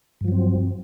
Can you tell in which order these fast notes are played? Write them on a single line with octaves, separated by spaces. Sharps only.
G2 F3 F#3 C4